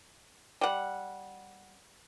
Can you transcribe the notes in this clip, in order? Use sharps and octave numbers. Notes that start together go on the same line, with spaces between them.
G3 F#5